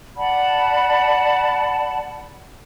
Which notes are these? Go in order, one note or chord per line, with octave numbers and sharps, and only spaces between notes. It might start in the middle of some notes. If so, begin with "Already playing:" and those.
D5 F#5 A5 B5